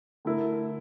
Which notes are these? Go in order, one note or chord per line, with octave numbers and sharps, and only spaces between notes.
D3 A3 E4 A#4